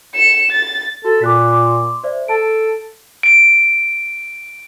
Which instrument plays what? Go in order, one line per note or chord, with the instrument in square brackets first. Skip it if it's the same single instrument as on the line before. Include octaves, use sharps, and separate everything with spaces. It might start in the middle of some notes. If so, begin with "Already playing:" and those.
[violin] C#7 E7
A6
[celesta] F#4 [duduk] A4
[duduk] A#2 [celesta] D6 F#6 B6
[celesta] C6 D6
C5 D5 E5
[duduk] A4 [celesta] A5 D7
[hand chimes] D7